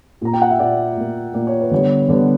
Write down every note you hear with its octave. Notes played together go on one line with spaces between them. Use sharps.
A#2 A#3 A#5
G5
F#5
E5
A#2 A#3 D5
A#2 A#3
A#2 A#3 D5
C#5
B4
D3 G3 B3 C#5
D3 G3 B3 D5